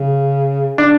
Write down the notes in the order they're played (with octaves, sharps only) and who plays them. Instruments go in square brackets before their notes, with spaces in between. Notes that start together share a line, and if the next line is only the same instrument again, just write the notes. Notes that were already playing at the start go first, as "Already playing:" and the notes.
Already playing: [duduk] C#3
[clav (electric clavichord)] D4